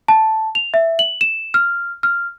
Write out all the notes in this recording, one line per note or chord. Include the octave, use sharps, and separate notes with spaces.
A5
F7
E5
F#7
E7
F6
F6